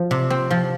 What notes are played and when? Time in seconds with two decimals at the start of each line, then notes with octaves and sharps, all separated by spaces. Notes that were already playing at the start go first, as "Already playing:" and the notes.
Already playing: F3
0.11 C3
0.30 C4
0.50 F3